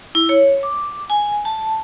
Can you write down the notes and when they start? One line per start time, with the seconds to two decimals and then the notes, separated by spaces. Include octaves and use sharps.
0.15 E4
0.29 C#5
0.63 D6
1.10 G#5
1.45 A5